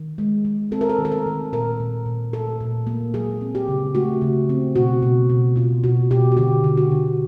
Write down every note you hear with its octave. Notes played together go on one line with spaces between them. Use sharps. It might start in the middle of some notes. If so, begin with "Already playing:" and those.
Already playing: D#3
G#3
G#3
C4 A4
A#4
A4
D#3
A4
A#4
D#3
A#2 A#4
A#2
A#2
A#2 A4
A#2
A#3
F#3 G#4
C4
G4
C#3
A3 F#4
C#3
C4
B2 F#4
B2
B2
B2 F4
B2 F#4
B2 G4
F#4
D3 G4
D3
F#4
D3